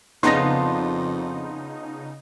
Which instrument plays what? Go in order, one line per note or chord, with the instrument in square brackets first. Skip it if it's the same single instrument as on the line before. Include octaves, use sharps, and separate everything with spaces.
[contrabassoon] F2 [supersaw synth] C#3 D#4 [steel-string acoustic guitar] B3 D4 F4 [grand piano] C6 A#6